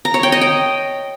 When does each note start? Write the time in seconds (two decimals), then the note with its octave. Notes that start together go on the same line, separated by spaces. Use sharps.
0.05 A#5
0.14 C#5
0.23 G5
0.32 D#5
0.41 G5